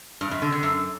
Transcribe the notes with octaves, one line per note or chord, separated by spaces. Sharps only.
G2
F#2
D3
D3
F#2